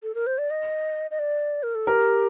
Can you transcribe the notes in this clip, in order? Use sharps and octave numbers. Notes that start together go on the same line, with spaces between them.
A4
A#4
C5
D5
D#5
D#5
D5
A#4
A4
G4 A#4